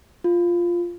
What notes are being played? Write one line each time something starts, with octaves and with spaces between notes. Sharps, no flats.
F4